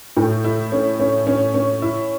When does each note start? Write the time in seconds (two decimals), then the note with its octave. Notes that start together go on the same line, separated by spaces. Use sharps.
0.17 A2
0.44 E4
0.72 C#4
1.00 C#4
1.27 C#4
1.54 C#4
1.82 E4